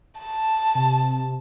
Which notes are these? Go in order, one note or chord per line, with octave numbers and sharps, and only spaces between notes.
A5
C3